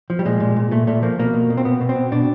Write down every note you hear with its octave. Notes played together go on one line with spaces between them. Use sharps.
F3
G3
A#2 G#3
A#2
A#2
A#2 A3
A#2 A3
F3 A#3
B2 A#3
B2
B2
C4
B2 B3
B2
C4
B2
B2 D4